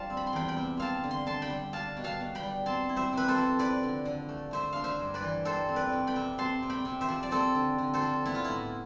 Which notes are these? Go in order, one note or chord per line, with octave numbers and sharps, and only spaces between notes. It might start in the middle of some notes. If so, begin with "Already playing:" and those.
Already playing: F3 G3 D4 F5 G5 A5
C4
B5
C6
E2 G5 B5
G5 B5
C3
C4 F5 A5
D3
C6
D3 A5 C6
G5 B5
G3
D4 F5 A5
B2
F5 A5
B2
G5 B5
G3
C4 A5 C6
E4
C5 E5
C3 B4
A4 C5
F3
E4 B4 D5
D3
D3
A3
A3 C5 E5
D4 F5
C5 E5
G2
B4 D5
E3
G3 A4 C5
C4
B4 D5
F2
G5 B5
C3
C4 A5 C6
C3
G5 B5
C3
C5 E5
F3
D5
C4 A4 C5
D3
D3
A4 C5
F3
B3 E4
F4
A2 E4